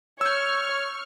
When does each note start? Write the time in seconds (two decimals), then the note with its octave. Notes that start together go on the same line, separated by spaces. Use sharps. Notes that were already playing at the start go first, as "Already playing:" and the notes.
0.21 C#5 C#6 E6 F6 G6